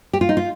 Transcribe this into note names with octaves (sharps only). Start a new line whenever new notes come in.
G4
F4
D#4
F4